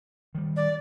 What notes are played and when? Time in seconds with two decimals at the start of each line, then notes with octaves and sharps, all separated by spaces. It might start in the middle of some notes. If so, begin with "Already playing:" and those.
0.35 D#3 G3
0.57 D5